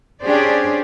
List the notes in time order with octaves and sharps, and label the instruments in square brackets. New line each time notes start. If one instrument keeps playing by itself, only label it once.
[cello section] C#4 D4 G4 G#4 C5 D5